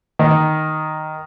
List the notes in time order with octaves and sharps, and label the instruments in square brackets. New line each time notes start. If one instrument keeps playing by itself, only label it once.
[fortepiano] D#3